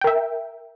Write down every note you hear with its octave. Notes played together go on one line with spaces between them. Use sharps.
A#4 E5 G5